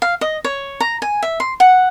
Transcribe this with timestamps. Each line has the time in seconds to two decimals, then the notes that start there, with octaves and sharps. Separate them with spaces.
0.02 F5
0.21 D#5
0.45 C#5
0.80 A#5
1.02 G#5
1.23 E5
1.40 C6
1.60 F#5